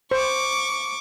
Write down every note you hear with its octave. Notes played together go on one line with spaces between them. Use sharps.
C5 C#6 D6